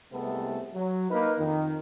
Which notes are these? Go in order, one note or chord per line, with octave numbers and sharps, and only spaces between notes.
C2 C3 G#3 A3 B3 A4
F#3
A#3 D#4 A#4 B4
F2 D#3